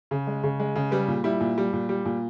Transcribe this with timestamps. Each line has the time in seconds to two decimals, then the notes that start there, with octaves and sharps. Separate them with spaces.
0.11 C#3
0.27 G#3
0.43 C#3
0.60 G#3
0.76 C#3
0.91 G3 B4
1.08 A#2
1.24 G3 E4
1.41 A#2
1.58 G3
1.73 A#2
1.89 G3
2.05 A#2